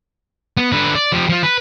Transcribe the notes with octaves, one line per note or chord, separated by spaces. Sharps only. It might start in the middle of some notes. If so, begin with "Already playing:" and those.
B3
D3 B4
D5
F3 G4
F3 F4
B4